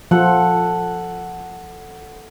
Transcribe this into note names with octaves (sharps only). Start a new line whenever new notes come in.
F3 A4 F#5